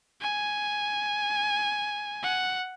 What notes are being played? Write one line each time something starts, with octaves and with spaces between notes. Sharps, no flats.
G#5
F#5